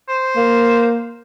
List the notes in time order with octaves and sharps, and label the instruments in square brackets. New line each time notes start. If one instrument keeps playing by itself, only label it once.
[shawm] C5
[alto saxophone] A#3